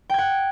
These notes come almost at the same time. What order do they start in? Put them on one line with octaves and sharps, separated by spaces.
G5 G#6 F#5